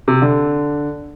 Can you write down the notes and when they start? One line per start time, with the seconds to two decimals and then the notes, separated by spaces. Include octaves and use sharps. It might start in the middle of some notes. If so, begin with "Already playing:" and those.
0.08 C3
0.22 D3